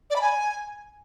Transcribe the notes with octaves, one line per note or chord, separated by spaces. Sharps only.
D5
B5
G#5